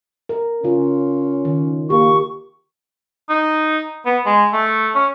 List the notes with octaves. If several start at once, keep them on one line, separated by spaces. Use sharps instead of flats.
A#4
C#3 C#4 F4
D#3
A#3 G4 C#6
D#4
B3
G#3
A3
C#4